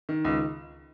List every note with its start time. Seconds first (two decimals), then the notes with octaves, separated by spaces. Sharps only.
0.09 D#3
0.25 C#2